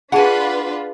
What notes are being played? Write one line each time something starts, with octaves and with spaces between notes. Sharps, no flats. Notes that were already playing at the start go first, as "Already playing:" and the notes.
D4 F4 G#4 B4 F#5 G#5 A5 B5